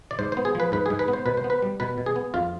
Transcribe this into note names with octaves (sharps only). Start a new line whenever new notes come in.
D5
G#2 C5
B3 C5
G#4
F3 B4
G#2 B4
G#2 G#4
B4
B3
C5
B2 B4
C5
B3
B4
G3
B2 B4
B2
G#4
B3
F2 F4